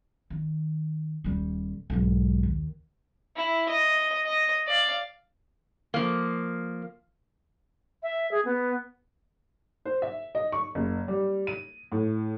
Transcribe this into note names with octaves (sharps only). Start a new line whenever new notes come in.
D#3
D#1 G3
B1 G#2
D#2
E4
D#5
D#5
D5 F5
F3 A#3
E5
G#4
B3
C5
E5
D#5
C#6
F#1
G3
D#7
A2